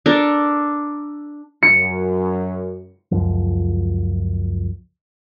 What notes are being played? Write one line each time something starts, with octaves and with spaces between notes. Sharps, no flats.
D4 A4 A#4
F#2 C#7
C#2 F#2 F3